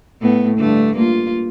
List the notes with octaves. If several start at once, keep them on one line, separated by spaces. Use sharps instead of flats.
A2 B3
G2 D3 A3
A#3 F4